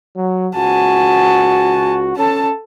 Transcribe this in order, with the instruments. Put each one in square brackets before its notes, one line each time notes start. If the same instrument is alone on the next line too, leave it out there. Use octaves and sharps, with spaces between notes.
[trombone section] F#3
[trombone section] C#2 F#4 [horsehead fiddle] G#5 A5
[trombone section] C#4 [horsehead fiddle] A4 A5